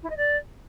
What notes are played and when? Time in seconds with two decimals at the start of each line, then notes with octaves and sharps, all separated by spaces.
0.03 E4
0.10 D#5
0.17 D5